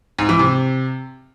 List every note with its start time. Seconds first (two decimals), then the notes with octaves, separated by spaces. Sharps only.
0.19 G#2
0.29 E3
0.39 C3